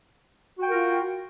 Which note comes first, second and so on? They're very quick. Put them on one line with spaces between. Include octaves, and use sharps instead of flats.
F#4 G5 A#4 F4